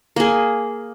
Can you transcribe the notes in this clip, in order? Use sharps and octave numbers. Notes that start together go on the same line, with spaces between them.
A#3 G#4